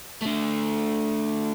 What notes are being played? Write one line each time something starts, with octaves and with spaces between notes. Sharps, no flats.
D3 A3